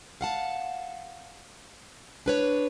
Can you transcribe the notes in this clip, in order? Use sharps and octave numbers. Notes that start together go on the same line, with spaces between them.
F5 F#5 A5
D4 B4 C#5